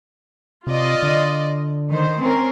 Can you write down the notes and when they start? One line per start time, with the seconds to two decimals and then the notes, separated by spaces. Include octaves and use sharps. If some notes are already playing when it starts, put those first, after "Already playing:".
0.67 C3 F4 D5 D#5
1.03 D3
1.90 D#3 C5
2.20 C4 C#4 A#4